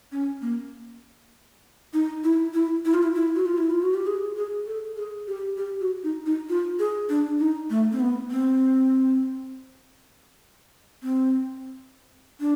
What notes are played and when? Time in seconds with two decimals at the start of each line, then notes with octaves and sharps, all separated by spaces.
0.12 C#4
0.42 A#3
1.94 D#4
2.24 E4
2.54 E4
2.86 E4
2.94 F4
3.03 E4
3.15 E4
3.35 F#4
3.45 F4
3.58 E4
3.70 F4
3.83 F#4
3.94 G4
4.07 G#4
4.36 G#4
4.67 A4
4.97 G#4
5.27 G4
5.57 G4
5.81 F#4
6.04 D#4
6.26 D#4
6.49 F4
6.79 G#4
7.09 D4
7.40 D#4
7.70 A3
7.92 C4
8.00 B3
8.31 C4
11.03 C4
12.40 D4